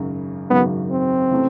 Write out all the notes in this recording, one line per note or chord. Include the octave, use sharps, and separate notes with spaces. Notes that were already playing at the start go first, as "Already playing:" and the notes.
Already playing: G#1 F#2 C#3 F#3
G#1 F#2 C#3 F#3 B3
C4
C3 E3 A3 C#4